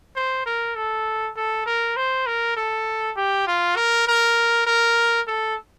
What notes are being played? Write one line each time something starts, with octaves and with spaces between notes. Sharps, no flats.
C5
A#4
A4
A4
A#4
C5
A#4
A4
G4
F4
A#4
A#4
A#4
A4